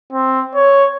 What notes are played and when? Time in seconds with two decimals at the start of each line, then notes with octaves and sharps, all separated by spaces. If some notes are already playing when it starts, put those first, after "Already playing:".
0.13 C4
0.55 C#5